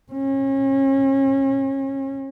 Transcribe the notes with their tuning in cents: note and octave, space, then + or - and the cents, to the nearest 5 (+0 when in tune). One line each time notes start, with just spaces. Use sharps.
C#4 -35